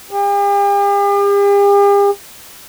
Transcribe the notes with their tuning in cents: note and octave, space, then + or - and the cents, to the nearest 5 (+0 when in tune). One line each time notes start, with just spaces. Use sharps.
G4 +45